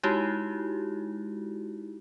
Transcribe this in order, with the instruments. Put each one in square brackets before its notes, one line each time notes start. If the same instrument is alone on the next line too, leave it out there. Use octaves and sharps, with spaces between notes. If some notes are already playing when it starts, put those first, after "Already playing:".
[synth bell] G#3 D#4 E4 F#4 G4